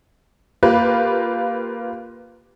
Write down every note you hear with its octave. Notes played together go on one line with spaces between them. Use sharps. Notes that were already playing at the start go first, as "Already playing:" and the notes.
A#3 F4 G4 B4